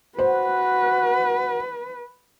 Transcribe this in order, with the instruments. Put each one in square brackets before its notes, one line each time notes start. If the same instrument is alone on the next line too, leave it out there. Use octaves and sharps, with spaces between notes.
[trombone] F#4 [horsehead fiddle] B4 [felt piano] C5